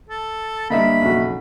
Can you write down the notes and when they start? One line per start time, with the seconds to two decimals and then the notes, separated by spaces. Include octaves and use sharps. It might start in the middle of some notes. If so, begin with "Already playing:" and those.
0.10 A4
0.70 G1 G2 A#3 D#5 E5 B5
1.01 B1 F2 C#3 F#4